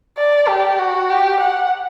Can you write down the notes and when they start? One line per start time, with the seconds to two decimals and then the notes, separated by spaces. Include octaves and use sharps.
0.18 D5
0.48 G4
0.79 F#4
1.10 G4
1.41 F#5